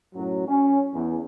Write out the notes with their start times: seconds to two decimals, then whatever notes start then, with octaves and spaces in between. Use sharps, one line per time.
0.15 F#2 A2 F#3
0.48 C#4
0.94 E2